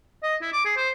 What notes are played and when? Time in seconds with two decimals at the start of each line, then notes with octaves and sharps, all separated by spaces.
0.23 D#5
0.42 E4
0.53 D6
0.65 G#4
0.77 C5